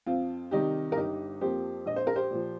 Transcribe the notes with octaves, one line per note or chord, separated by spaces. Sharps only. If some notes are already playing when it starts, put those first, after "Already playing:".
F2 C4 F4
C3 D#3 G3 D#4 G4
A#4
G1 D#4 G4
F2 F3 A#3 G4 C5
A#1 D#5
C5
A#4
G4 C5
A#2 F3